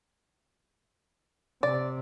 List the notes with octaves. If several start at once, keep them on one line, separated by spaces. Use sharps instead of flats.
C3 D5